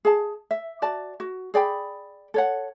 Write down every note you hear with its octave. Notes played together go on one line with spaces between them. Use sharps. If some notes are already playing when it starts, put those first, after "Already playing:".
G#4 A5
E5
F#4 D5 A5
F#4
G#4 D5 G5 B5
A4 C#5 F#5